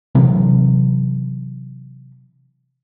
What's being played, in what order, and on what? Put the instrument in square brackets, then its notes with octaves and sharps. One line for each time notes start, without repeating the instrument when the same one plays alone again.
[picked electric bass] C3 E3 F#3